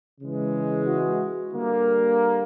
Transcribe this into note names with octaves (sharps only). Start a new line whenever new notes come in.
C#3 E3 G#3
E4 F#4
D3 G3 A#3